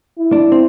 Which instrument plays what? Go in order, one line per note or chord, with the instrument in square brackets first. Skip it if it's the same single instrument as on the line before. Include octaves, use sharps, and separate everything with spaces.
[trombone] E4
[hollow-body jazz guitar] D4
C4